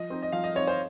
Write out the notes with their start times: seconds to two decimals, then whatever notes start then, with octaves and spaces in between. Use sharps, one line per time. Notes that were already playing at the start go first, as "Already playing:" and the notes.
Already playing: F3 D#5
0.10 C4 D#4
0.22 D#5
0.32 F3 F5
0.44 D#5
0.55 C4 D#4 C#5
0.67 C5